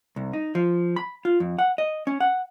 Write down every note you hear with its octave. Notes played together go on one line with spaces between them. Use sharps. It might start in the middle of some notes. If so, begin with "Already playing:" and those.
C2
D#4
F3
B5
F4
F2
F#5
D#5
C#4
F#5